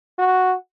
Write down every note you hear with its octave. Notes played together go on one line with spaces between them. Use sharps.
F#4